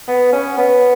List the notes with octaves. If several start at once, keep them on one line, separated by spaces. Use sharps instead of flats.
B3
C#4
B3